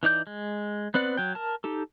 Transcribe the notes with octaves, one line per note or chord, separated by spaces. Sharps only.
E3 D#4 D5 G6
G#3
B3 C4 B4 D5 F#5
F#3 G5
A#4 A5
D#4 G4 A4